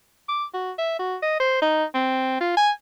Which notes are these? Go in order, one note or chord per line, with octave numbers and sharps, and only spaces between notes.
D6
F#4
E5
F#4
D#5
C5
D#4
C4
F4
G#5